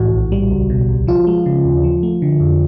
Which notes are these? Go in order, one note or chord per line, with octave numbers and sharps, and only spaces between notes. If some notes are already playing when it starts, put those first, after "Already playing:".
Already playing: C2 A2 E3 A3 F#4
A#1
G3
C#2
B2
C#2
F3 F4
G#3
C#3
D#2
F3
A3
D3
F2